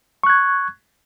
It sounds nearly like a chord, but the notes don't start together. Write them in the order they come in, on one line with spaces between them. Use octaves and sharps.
C#6 F#6 G#6